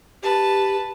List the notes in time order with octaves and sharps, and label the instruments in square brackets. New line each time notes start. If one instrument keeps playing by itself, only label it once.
[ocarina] G4 [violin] B4 A5